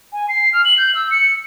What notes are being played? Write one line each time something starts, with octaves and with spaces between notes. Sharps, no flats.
G#5
C7
F6
F#7
G6
E6
C#7